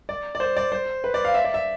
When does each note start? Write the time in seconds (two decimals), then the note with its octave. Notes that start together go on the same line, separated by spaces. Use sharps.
0.09 D5
0.35 D5
0.40 C5
0.57 D5
0.72 C5
1.04 B4
1.14 D5
1.25 F5
1.34 E5
1.45 D5
1.54 E5